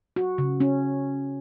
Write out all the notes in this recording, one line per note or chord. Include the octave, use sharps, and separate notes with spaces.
F#4
C#3
C#4